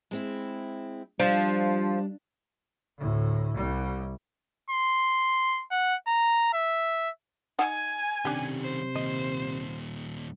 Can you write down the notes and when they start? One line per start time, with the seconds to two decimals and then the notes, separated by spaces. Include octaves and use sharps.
0.11 G#3 C4 E4
1.20 F3 G3 D4
2.99 D2 A2
3.55 C2 G3
4.70 C6
5.71 F#5
6.07 A#5
6.53 E5
7.59 D#4 F#5 G#5
8.25 C3 D#3 C#4 D4 G4
8.62 C5
8.95 D#2 A#2 D#5